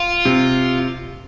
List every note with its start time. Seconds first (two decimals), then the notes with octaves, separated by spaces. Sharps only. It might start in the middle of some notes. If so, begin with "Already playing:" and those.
Already playing: F4
0.25 C3